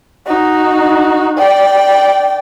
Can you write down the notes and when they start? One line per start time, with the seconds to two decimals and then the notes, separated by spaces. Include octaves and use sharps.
0.27 D#4 F#4
1.38 D5 G5